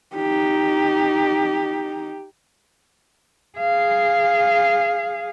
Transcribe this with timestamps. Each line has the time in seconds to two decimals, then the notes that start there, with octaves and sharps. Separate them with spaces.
0.16 D#4 G4
3.59 G#4 F5